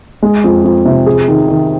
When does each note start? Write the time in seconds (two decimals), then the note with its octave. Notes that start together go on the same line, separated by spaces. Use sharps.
0.22 G#3
0.44 F2
0.64 F2
0.85 C3
1.06 G#4
1.28 D#3
1.49 D#3